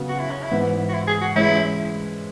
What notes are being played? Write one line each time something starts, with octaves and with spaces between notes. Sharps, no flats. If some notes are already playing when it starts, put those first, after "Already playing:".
Already playing: C#3 F#3 B3
F#4
E4
C#4
E4
G#2 E3 B3
F#4
E4
G#4
F#4
E3 G#3 C#4 E4 G#4